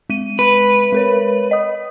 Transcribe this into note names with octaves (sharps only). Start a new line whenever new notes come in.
G#3 D#7
B4
G#3 A#4 C#5
D#5 D#6